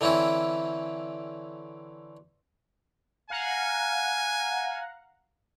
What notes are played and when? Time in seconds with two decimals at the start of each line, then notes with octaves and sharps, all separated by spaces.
0.01 D3 E3 C4 C#4 E4
3.30 F5 F#5 G#5 A#5